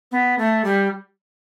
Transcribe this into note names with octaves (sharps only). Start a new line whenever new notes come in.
B3
A3
G3